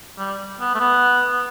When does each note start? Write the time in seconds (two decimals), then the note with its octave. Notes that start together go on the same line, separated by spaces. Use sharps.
0.18 G3
0.60 B3
0.75 A3
0.80 B3
1.31 B3